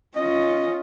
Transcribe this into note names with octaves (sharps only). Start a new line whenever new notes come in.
C#4 F4 D#5